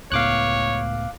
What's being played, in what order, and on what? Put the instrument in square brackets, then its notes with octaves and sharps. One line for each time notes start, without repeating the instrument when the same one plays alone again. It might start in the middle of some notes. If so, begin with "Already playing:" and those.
[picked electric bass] C#2 A2 B3 [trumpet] C#5 [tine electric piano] F5 D6 F#6